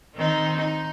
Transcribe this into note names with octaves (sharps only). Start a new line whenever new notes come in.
D#3 C4 D#4
D#4